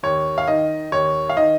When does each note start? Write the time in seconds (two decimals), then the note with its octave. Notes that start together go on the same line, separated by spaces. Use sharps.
0.03 D#2 C#5
0.38 F5
0.48 D#3 D#5
0.92 D#2 C#5
1.29 F5
1.37 D#3 D#5